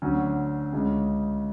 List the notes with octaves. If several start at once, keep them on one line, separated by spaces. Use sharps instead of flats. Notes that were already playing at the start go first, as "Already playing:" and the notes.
D2 D3 F#3 C#4
C#2 C#3 G#3 C#4